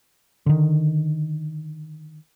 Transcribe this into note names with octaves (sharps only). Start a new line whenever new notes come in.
D3 D#3